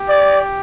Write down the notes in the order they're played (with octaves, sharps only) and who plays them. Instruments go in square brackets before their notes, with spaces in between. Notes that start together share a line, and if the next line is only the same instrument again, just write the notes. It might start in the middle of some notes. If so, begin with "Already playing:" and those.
Already playing: [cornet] G4
[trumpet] D5